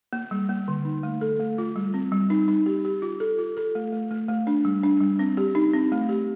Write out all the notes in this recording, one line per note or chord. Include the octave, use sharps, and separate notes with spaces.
A#3
G3
A#3
D3
D#4
A3
A4
A3
F4
G3
C4
G3
D#4
D#4
G4
G4
F4
A4
F4
A4
A3
A3
A3
A3
D4
G3
D4
G3
C4
G4
D#4
C4
A3
G4